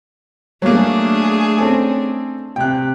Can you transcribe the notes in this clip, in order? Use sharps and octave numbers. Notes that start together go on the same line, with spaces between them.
F#3 A3 A#3 D4 G#4
C4 C#4 A4
C3 G5 F#6